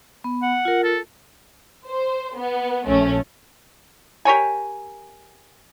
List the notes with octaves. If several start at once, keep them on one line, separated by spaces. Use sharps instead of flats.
B3
F#5
F4 A#4
A4
C5
B3
A#1 A3 C#4
G4 A#4 C#5 G#5